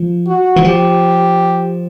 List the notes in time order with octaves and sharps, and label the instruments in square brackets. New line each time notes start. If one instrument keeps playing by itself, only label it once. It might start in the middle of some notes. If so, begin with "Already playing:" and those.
Already playing: [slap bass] F3
[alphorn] F#4
[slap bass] E3
[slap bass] F3 [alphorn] G4